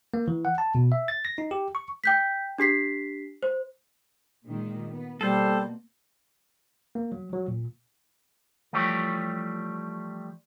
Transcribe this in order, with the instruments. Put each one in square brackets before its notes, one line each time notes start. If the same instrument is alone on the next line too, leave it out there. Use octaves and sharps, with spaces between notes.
[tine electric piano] A#3
E3
F#5
A5
B2
E5
A6
A#6
D#4
G4
C#6
[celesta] G5 G6 B6
D4 G4 B6 C7
C5
[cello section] A#2 D#3 G#3
B3
[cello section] B2 A#3 [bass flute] G3 [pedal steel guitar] A4 C5
[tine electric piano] A#3
F#3
F#3
A#2
[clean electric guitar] E3 F3 G3 A3 G4 C#5